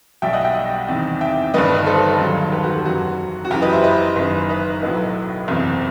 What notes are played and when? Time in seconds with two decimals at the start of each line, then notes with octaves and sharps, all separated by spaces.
0.22 B1 B2 G3 E5 G5
0.33 D#5 F#5
0.44 E5 G5
0.88 E2 C3 D#3
1.21 E5 G5
1.54 G1 G2 D#3 G3 B4 D#5
1.86 A4 C5
2.19 E1 D#2 D#3 F#3
2.52 G4 B4
2.63 F#4 A4
2.85 F#1 F#2 F#3 F#4
3.45 F#4
3.51 F#1 F#2 E3 G4
3.62 B4 D#5
3.73 C5 E5
3.84 B4 D#5
4.16 F#1 F#2 D#3
4.49 B4 D#5
4.82 B1 A2 F#3 B4 D#5
5.48 F#1 E2 C3